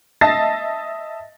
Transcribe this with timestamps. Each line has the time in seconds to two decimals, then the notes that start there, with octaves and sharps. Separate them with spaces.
0.21 D#5 E5 A5 A6 A#6 C7